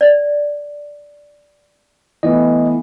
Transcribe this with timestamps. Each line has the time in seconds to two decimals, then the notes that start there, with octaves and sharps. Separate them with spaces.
0.01 D5
2.23 E3 A3 B3 D#5